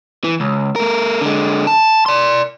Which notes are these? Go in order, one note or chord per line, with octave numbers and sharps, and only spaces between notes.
E3
C#2
A3 A#4
D3 G#3
A5
D5 C6